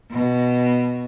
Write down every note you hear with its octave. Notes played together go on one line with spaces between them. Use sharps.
B2